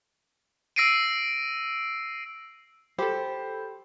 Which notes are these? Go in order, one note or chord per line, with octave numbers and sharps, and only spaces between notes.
E6 A#6 C7 D7 D#7
G4 A4 C5 B5